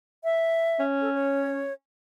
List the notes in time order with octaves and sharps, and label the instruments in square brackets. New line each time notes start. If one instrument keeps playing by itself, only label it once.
[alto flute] E5
[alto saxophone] C#4
[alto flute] A4
C#5